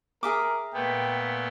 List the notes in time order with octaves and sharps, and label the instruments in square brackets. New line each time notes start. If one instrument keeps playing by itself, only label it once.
[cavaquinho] G#4 E5 D6 [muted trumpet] A#4
[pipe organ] A#2 A3 B3 [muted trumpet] G5